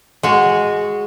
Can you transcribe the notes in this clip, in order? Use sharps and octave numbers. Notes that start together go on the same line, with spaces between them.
G#3 F#4